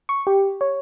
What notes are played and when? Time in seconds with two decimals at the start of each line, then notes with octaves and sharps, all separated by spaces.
0.09 C#6
0.27 G4
0.61 C#5